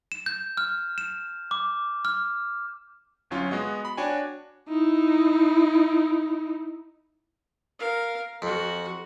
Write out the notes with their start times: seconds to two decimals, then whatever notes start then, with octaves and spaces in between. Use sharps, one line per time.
0.12 E7
0.26 G6
0.57 F6
0.98 E7
1.51 D6
2.05 F6
3.31 G1 F#3 C#4 F4
3.51 G#3 B3 F#4 D#5
3.85 B5
3.97 D4 F#4 C#5 G5 G#5
4.69 D#4 E4
7.79 A#4 F5
8.42 F2 F#4 F#5